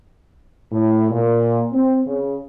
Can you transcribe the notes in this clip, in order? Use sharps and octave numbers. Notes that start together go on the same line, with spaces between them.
A2
A#2
C4
C#3